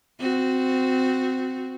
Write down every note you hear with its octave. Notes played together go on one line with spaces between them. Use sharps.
C4 F#4